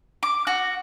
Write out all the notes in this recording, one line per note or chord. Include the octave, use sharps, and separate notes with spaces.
D6
F#4